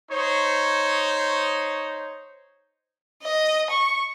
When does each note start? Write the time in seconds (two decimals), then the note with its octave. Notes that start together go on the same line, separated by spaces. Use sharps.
0.10 D#4 C5 C#5 C#6
3.22 D#5
3.70 C#6